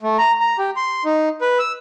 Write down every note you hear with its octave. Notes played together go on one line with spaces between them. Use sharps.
A3
A#5
A#5
G4
C6
D#4
B4
E6